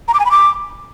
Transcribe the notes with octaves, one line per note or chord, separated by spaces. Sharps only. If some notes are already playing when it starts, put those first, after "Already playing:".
A#5
D6
G#5
B5
D6